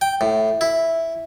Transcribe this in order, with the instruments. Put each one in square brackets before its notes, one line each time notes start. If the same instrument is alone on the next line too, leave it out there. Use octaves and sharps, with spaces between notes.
[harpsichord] G5
A2
E4